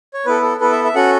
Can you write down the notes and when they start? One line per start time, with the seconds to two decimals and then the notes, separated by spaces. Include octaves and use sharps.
0.14 C#5
0.26 B3 E4 A4 B4
0.43 A4
0.60 B3 E4 A4 B4
0.72 E5
0.84 E5
0.95 C#4 F#4 A4 F#5